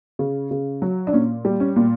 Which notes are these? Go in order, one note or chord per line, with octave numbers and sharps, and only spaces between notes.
C#3
C#3
F#3
D4
A#2 C#4
G3
C#4
A#2